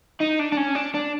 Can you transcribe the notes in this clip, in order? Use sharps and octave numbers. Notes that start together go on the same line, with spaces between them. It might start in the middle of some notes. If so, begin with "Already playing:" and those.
D#4
D4
D4
C#4
D4
D4